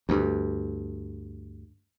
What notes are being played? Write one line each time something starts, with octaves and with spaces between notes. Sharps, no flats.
D2 G2